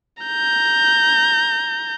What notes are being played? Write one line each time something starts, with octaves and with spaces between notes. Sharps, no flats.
A#5 G6